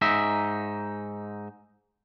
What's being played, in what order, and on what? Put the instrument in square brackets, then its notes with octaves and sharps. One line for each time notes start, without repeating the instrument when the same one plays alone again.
[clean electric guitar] G#2 D#4 E5